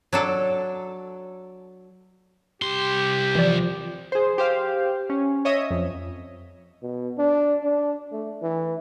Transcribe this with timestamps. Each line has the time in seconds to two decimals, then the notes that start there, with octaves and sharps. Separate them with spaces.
0.13 F#3 D4 A4
2.62 C2 G4 C6
3.35 E3 F3 D5
4.12 G#4 C5
4.38 G4 C5 F5
5.10 C#4
5.45 C#5 D#5 E5 D#6
5.71 F2
6.82 B2
7.18 D4
7.63 D4
8.12 A3
8.42 E3